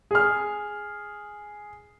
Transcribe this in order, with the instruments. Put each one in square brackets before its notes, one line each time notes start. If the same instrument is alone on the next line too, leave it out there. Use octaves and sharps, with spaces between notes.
[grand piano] G#4 F6